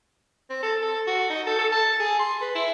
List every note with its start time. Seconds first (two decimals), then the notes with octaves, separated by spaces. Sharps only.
0.50 C4
0.63 A4
0.82 A4
1.07 F#4
1.30 D#4
1.47 A4
1.59 A4
1.72 A5
2.00 G#4
2.19 C6
2.41 B4
2.55 E4